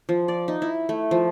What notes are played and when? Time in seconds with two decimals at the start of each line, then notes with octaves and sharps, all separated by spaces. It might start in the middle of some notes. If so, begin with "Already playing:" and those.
0.09 F3
0.28 D5
0.48 D#4
0.62 E4
0.89 A3
1.11 F3